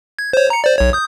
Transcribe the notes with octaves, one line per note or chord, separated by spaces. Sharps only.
G#6
C5 C#5
A#5 C#7
C5 D5
B1 C#5
D#6 G6